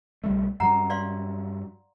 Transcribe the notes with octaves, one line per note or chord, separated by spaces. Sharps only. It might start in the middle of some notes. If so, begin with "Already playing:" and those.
B1 G3 A3
G2 F#3 F#5 A#5
D5 F5 C6